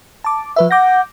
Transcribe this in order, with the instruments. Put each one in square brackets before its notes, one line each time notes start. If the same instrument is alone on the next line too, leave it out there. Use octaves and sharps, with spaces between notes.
[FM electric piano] A5 D6
F3 B4 E5
[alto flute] F#5 [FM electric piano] D6 G6 A#6